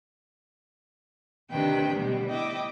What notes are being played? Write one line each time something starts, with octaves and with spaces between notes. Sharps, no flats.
D2 C3 D#3 D4 B4 G5
B2 G3 G#3
E4 D#5 G5 D6